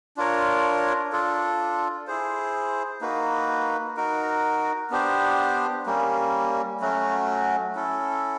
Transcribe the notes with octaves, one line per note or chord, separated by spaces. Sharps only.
D4 F4 A#4 C#5
D4 F4 A4
E4 G#4 C5
A#3 D#4 F#4 B4
D#4 F#4 A#4
B3 D4 G4 C5
G3 A#3 C#4
F#3 A3 C#4 F#4
C#4 E4 A4